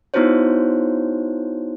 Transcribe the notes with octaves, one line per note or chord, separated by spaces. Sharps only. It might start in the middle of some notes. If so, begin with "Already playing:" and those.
B3 D#4 E4 F#4 C5 C#5